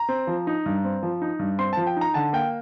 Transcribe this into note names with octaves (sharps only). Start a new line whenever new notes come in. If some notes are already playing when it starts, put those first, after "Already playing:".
Already playing: A#5
C4
F3
D#4
G2
C4
F3
D#4
G2
C4 C6
F3 A5
G5
D#4 A#5
D3 A5
A#3 G5